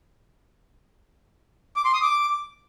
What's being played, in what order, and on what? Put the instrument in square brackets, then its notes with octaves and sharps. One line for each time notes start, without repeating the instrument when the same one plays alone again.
[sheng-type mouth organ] D6
C6
D#6
D6